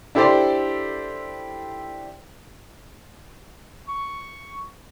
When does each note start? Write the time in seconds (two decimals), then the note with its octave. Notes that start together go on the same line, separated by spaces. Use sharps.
0.15 D4 E4 G4 A4 C5 D5
3.88 C#6